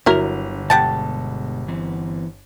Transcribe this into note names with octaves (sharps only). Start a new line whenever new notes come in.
G1 D3 F#3 E4 A#4 F7
B2 G#3 G4 A4 F#5 A5
E3 B3 C4